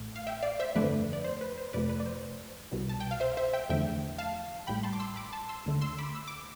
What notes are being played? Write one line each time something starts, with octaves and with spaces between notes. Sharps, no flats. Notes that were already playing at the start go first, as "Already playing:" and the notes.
Already playing: A1 A2 A3
F5
E5 G5
D5 F5
C5 E5
G1 F2 D3 F3 A3 B4 D5
D5
C5
B4
C5
F2 C3 F3 A3 B4 D5
B4
D5
C5
C2 B2 G3
A5
G5
F5
C5 E5
C5 E5
E5 G5
E2 D3 F3 A3 E5 G5
F5 A5
A1 A2 G3 G5 B5
A5 C6
D6
C6 E6
B5 D6
A5 C6
C6 E6
D2 D3 A3
C6 E6
B5 D6
E6
D6